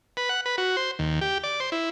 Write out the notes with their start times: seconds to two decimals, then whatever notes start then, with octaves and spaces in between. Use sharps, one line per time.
0.17 B4
0.29 F#5
0.46 B4
0.58 F#4
0.77 C5
0.99 D#2
1.21 G4
1.44 D5
1.60 C5
1.72 E4